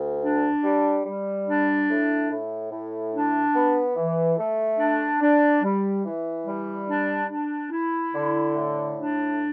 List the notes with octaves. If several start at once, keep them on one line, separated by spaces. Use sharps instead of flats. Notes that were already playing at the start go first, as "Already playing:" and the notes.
Already playing: D2
D4
G3
G3
D4
A2
A2
A2
D4
B3
E3
A3
D4
D4
G3
E3
G3
D4
D4
E4
D3
A2
D4